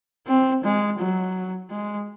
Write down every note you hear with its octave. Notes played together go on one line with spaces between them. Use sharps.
C4
G#3
F#3
G#3